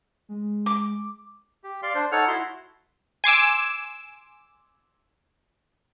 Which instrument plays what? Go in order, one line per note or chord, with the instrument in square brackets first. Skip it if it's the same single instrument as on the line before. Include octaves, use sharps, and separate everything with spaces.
[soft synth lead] G#3
[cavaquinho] D6
[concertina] G4
D5 F5 C6
D4 C5
D#4 A4 C#5 F#5 F6
E4 F#4 C6
[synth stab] G#5 C6 D6 E6